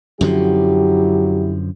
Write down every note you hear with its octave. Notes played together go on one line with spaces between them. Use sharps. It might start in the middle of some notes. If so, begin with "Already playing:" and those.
F#2 D3 F3 F#3 E4 G4